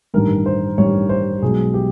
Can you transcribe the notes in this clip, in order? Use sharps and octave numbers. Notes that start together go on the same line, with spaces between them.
A1 G2 D#3 G3 A#4
C5
A1 G2 D#3 G3 C#5
C5
B1 B2 G#3 G#4
G4